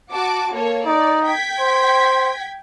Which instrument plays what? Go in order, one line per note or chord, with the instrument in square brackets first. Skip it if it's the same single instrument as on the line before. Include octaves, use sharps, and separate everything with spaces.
[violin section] F#4 A5 D6
A#3 A4 C#5
[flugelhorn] D#4 [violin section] D5
[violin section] G5 G#6 B6
[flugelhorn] C5